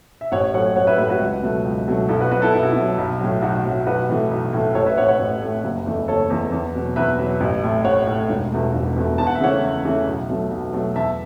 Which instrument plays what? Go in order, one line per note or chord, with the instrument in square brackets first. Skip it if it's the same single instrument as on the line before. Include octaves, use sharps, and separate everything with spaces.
[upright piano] E5
A1 C#5 F#5
A2 F#3 A3 C#5 F#5
A1 C#5 F#5
B4 E5
A2 F#3 A3 B4 E5
F#4 B4
C#2
B2 F#3 A3
C#2
B2 F#3 A3
B1 E4 A4
F#4 B4
B2 F#3 F#4 B4
E4 A4
B1 E4
F#4
B2 E4
F#3
B1
A2 F#3
B1 F#4
A2 F#3
B1 F#4 B4
A2 E3 A3
B1
A2 E3 A3
A1 A4 C#5
B4 E5
A2 A3 C#5 F#5
C#5 F#5
A1
A2 A3
F#1
E2 E3 A3
F#1 A4 C#5
E2 E3 A3
E2
B2 F#3
E2 B4 E5
B2 F#3
A1
A2 A3
A1 C#5 F#5
A2 A3
E1
E2 B2 A3
E1
E2 B2 A3
E2 A5
F#5
E5
C#3 E3 A3 C#5 F#5
E2
C#3 E3 A3
B1
B2 F#3 A3
B1
B2 F#3 A3
E2 E5 A5